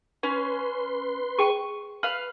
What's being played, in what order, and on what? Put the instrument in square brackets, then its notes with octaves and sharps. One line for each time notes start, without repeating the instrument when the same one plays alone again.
[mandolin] C#4 [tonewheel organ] B4 C6
[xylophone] G#4 G5 D#7 [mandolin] C#6
[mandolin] B4 F5 [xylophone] F6